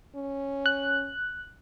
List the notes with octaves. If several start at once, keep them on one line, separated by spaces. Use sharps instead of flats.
C#4
F#6